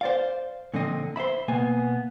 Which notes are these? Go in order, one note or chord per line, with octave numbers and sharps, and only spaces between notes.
C5 D5 F5
A#2 D3 F3 C4 D#5
C5 D5 E5 B5
B2 A#3 B3 G#5